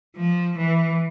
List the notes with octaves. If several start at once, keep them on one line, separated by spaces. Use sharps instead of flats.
F3
E3